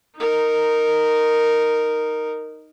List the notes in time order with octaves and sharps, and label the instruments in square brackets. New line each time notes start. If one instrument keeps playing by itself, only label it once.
[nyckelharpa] D#4 A#4